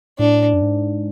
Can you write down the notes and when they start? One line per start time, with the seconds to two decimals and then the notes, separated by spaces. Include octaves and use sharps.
0.19 A2 D4
0.54 F#2
0.62 G#2